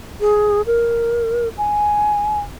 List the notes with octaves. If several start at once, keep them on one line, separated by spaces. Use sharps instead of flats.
G#4
A#4
G#5